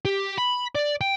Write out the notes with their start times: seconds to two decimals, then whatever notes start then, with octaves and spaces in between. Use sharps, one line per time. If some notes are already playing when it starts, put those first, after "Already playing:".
0.05 G4
0.38 B5
0.75 D5
1.01 G5